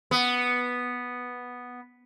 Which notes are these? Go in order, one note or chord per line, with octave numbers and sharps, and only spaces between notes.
B3